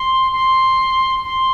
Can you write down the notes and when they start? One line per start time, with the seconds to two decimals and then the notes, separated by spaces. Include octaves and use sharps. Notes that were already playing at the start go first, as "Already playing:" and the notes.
Already playing: C6
0.33 C6
1.25 C6